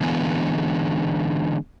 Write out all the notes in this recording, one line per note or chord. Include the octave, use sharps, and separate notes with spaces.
D3 E3 G#3 B3